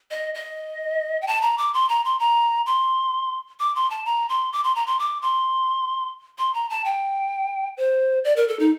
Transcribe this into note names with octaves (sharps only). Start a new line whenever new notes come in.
D#5
D#5
G5
A5
A#5
D6
C6
A#5
C6
A#5
C6
D6
C6
A5
A#5
C6
D6
C6
A#5
C6
D6
C6
C6
A#5
A5
G5
C5
D5
A#4
A4
D#4